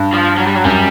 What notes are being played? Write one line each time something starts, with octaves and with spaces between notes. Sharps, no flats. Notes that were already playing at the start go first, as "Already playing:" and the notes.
Already playing: G2
F3
F#3
G3
F#3
F#2 G3